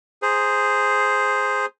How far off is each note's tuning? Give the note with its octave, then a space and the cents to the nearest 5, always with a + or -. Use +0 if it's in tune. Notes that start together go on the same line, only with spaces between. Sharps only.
G#4 +0 C5 +0 A#5 +0